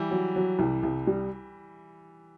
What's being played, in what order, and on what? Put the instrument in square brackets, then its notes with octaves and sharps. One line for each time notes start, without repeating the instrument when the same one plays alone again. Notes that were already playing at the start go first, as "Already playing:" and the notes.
Already playing: [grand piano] E3 G3
[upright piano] F#3
F#3
C2
C2
G3